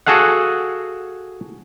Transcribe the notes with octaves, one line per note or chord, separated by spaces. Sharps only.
F#4 G#4 A4 F5 F#5